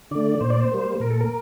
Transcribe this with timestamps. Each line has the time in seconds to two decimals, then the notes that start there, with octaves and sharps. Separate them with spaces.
0.11 D3 A3 D5
0.40 A#2 C5
0.50 D5
0.60 C5
0.71 G3 A#3
1.00 A#2 A#4
1.10 A4
1.21 A#4